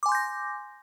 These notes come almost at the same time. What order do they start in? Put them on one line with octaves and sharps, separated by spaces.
D6 G#5 C6 G6 A#6